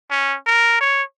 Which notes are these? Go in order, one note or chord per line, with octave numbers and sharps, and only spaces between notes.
C#4
A#4
C#5